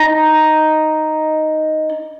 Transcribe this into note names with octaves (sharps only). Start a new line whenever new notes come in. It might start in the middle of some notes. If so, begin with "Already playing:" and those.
Already playing: D#4